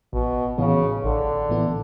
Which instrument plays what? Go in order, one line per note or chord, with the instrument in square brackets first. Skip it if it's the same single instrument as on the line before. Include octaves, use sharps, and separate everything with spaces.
[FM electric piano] A1 [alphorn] B2
[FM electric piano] A2 E3 B3 E4 [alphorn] C#3
[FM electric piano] A1 [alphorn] D3
[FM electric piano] A2 E3 B3 E4